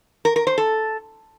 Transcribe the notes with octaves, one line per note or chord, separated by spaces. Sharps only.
A#4
A#4
C5
A4